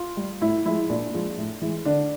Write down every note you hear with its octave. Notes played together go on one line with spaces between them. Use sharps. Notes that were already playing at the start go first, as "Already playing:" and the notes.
Already playing: F4
G3
A2 E4
F3 G#3 E4
A#2 D4
F3 G#3
A2
E3 G#3
D3 D4